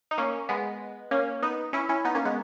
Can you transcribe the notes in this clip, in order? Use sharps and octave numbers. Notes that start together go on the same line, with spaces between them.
D#4
A#3 C#4
G#3 B3
A#3 C#4
B3 D#4
C#4 E4
C#4 E4
B3 D#4
A#3 C#4
G#3 B3